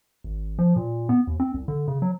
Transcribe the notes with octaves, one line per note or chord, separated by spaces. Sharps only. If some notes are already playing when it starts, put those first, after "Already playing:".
G#1
F3
A#2
B3
D#2
C4
C2
D3
C#3
F#3